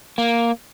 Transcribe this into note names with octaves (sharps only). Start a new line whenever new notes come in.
A#3